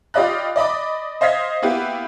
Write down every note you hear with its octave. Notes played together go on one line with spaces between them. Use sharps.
F4 G4 D5 D#5 B5 F#6
D5 D#5 B5 D6
C5 D#5 F5 G#6 B6
A#3 B3 E4 F#4 G4 B4